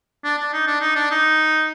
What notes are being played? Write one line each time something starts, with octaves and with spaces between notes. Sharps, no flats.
D4
D4
D#4
D4
D#4
D4
D#4